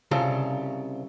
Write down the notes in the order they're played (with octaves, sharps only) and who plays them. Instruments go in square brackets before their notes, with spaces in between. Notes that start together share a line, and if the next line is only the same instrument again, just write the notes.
[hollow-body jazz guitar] C2 C#3 F4 A4